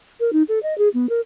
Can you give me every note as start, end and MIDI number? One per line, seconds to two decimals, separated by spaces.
0.20 0.31 70
0.33 0.43 63
0.49 0.59 69
0.63 0.77 75
0.78 0.89 68
0.94 1.09 59
1.09 1.21 70